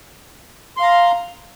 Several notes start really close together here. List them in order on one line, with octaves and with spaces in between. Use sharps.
C6 F5 A#5